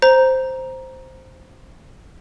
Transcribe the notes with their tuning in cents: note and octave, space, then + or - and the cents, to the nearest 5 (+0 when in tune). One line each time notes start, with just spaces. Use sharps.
C5 +0 A#5 +10